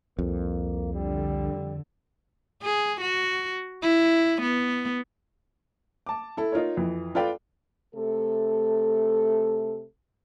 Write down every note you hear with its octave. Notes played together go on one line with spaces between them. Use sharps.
C2 F2 A#3
D3 G3
G#4
F#4
E4
B3
A5 D6
E4 A4
D#4 F4 A#4 C#5
F2 E3
F4 A4 B4 D5 F5 G5
C3 A3 A4